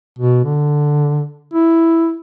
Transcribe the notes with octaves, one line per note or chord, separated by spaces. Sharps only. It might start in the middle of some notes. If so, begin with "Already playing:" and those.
B2
D3
E4